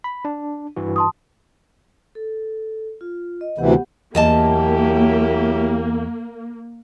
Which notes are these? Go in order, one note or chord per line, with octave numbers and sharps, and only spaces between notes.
B5
D4
G2 E3 F#4
A5 C6 D#6
A4
F4
D#5
D2 C3 E3 B3 G4 F#5
E2 F#3 A#3 E4 G4 D#5 A5